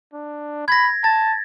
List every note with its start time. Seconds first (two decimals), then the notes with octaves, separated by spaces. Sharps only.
0.13 D4
0.68 B5 G#6 A#6
1.04 A5 A6